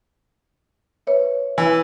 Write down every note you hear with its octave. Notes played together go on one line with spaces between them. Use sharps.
B4 C#5 E5
E3